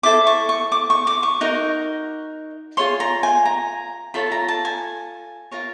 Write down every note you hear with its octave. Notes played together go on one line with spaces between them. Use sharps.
E4 A4 C5 D6
C#6
C#6
D6
C#6
D6
C#6
D#4 F#4 A#4
F4 G#4 C#5 C6
A#5
G#5
A#5
F4 A4 C#5 B5
A#5
A5
G#5
F4 A#4 C#5